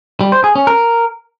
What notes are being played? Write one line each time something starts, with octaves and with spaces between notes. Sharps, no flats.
G3
C5
G#4
C#4
A#4